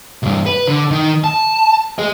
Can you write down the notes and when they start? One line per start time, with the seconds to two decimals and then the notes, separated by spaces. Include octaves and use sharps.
0.23 C2 G2
0.46 B4
0.68 D3
0.91 D#3
1.24 A5
1.99 G#4 D#5